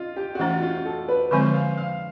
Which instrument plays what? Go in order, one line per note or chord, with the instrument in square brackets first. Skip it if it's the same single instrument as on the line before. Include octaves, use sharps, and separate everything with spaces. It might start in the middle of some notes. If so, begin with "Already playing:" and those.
Already playing: [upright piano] D#4 F4
G4
F#4
[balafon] E3 A3 C#4 [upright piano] F4
[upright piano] F4
A4
B4
[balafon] D3 F3 G#3 C4 [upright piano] C5
[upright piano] F5
F5